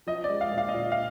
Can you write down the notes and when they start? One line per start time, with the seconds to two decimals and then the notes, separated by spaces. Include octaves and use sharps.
0.07 F3 D#5
0.24 D5
0.29 G#3
0.41 F5
0.52 A#2
0.58 F5
0.68 D#5
0.74 A#2 D5
0.92 F5